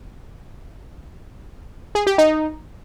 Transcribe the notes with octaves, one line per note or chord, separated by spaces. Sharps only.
G#4
G4
D#4